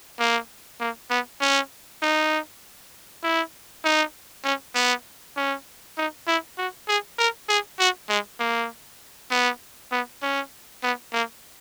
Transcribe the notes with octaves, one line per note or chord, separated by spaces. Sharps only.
A#3
A#3
B3
C#4
D#4
E4
D#4
C#4
B3
C#4
D#4
E4
F#4
G#4
A#4
G#4
F#4
G#3
A#3
B3
B3
C#4
B3
A#3